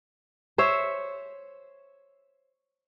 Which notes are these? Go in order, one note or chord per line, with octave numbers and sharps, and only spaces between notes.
C5 C#5 E5